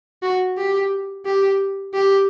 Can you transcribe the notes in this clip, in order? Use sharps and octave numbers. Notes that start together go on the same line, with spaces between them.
F#4
G4
G4
G4